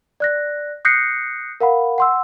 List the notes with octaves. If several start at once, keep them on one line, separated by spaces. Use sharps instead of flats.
D5 F#6 A#6
D#6 F#6 G6 A#6 C7 C#7
A#4 F5 F#5 B5
F#5 C6 E6